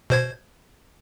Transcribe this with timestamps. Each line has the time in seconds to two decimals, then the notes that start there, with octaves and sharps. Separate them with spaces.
0.10 B2 C5 G#6